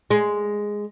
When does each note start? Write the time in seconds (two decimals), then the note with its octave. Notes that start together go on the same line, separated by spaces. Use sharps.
0.11 G#3